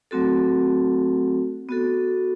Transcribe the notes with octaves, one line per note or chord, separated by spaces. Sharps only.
F#3 A3 C4 F#4 A4
B3 F#4 A4